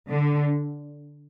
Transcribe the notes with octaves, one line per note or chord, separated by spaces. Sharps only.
D3